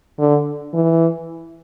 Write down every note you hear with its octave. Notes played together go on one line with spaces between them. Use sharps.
D3
E3